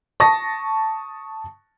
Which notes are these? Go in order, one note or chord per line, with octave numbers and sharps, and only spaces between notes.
A5 C#6 D#6 A#6